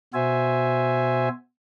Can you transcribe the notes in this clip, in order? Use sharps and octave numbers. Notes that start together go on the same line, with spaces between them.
B2 F#4 C5 E5 G#5